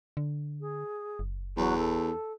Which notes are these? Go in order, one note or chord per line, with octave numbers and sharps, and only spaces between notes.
D3
G#4
F#1
E2 F#3
A4